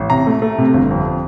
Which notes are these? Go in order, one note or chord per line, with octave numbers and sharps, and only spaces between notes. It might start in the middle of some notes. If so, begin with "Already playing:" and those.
Already playing: A1
C3 A#5
A3
A3
C3
G1
F2